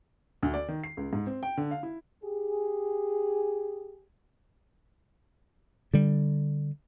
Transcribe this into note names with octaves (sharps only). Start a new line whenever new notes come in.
D2
D5
D#3
C7
C#2
G#2
C4
G5
D3
F5
E4
G4 G#4
D3 G3